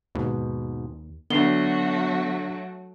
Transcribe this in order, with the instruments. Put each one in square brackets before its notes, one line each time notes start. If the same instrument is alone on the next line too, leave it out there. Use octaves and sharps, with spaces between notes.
[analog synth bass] D#2 [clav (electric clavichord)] G#2 B2
[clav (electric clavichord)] D3 [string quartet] F#3 A3 F#4 [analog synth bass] B3 [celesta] D4 C7 G7